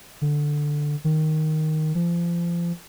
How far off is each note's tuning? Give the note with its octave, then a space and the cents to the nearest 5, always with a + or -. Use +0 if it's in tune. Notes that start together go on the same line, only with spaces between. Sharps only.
D3 +5
D#3 +0
F3 -30